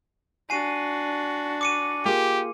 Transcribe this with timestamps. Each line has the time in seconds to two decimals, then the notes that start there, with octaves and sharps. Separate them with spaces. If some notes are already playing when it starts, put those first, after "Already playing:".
0.50 D4 F#4 G#5 C7 D#7
1.61 D6 C#7 D#7
2.05 A#3 F4 G4 G#4